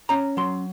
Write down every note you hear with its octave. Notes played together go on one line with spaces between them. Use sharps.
C#4 A#5
F#3 C6